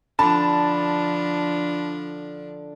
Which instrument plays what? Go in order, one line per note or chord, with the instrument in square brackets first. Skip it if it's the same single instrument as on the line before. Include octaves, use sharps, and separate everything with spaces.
[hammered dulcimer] D3 [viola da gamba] F3 D4 [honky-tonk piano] A5 [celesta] B5